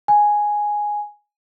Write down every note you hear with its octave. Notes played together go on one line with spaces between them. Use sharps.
G#5